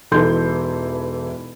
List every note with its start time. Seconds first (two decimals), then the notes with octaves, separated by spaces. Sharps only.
0.11 E1 E3 D#4 A4 C6 G6